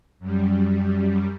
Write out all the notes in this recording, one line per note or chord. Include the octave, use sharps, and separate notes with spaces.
F#2 G3